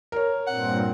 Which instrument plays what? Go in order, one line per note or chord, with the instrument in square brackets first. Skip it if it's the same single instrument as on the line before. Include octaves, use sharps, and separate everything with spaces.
[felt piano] A#4 C#5
[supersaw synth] G2 A#2 C4 [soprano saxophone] F#5